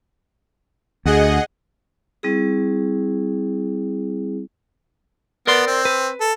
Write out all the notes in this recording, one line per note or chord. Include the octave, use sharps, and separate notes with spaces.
D2 G#4 D#5 F#5
G3 C4 E4 G#4
B3 A#4 D5 C6
C4
B4
A4